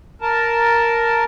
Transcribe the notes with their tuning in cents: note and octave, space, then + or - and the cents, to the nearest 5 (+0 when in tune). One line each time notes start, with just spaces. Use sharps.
A#4 +0 A5 +0